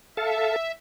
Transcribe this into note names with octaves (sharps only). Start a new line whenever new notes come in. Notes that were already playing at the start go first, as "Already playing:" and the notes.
A4 E5 F5 A5